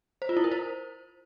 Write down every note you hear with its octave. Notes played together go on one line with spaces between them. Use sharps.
C5
F4
E4
A#4
C5